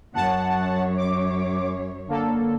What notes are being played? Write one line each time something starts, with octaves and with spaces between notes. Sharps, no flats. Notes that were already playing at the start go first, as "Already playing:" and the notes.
F#2 C#5 F#5 A5
D6
D3 A#3 A4